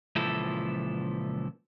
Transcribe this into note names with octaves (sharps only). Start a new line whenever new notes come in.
C#2 A#2 E3 F3 E4 A4